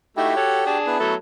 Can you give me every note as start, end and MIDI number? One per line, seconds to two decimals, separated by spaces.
0.17 0.36 57
0.17 0.36 63
0.17 0.36 64
0.17 0.78 66
0.17 0.78 67
0.17 0.78 79
0.36 0.61 69
0.36 0.61 73
0.36 0.61 78
0.66 0.97 62
0.66 0.97 68
0.66 0.97 81
0.87 1.15 59
0.87 1.15 64
0.87 1.15 71
1.00 1.15 54
1.00 1.15 57
1.00 1.15 69